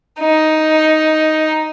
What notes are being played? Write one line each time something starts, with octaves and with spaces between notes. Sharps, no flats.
D#4